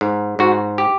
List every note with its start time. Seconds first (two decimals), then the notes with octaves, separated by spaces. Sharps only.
0.01 G#2
0.39 G#2 F#4
0.78 G4